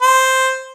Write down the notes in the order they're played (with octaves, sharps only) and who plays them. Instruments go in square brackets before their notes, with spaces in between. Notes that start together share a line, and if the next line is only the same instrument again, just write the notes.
[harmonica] C5